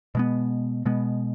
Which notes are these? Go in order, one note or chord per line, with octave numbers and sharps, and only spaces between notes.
B2 G#3 B3
B2 G#3 B3